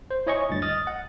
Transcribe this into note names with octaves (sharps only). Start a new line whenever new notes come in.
C5
E4 C#5 D#5 G#5 C#6
D2 G2 A6
D#5 D#6 F6 A6
F#5